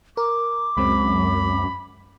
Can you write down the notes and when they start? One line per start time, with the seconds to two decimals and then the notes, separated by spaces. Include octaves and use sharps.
0.17 A#4 D6
0.77 C#2 F#2 G#3 C4 B5